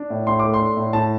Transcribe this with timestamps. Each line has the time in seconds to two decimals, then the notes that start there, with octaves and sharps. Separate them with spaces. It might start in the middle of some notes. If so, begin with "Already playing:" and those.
Already playing: D4
0.10 A2
0.26 A2 C6
0.40 A3 D6
0.54 C6
0.60 D4
0.77 A2
0.93 A2 A5